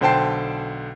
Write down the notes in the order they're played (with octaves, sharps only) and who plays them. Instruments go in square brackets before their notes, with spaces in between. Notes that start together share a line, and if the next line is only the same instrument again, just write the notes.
[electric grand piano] B1 D3 C5 G5 A5 C7